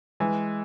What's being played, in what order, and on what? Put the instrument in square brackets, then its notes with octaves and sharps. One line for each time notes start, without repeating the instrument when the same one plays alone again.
[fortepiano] E3 [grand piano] G#3